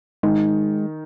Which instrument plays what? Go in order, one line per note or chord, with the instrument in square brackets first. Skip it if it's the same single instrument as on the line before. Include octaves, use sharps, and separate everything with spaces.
[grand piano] D#3 [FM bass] G#3